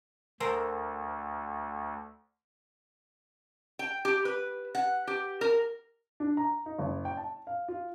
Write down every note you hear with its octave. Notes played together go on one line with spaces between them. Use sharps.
D2 A4 A#4 C5
G5
G4
B4
F#5
G4
A#4
D4
A#5
D#4
F#1
G5
A5
F5
F4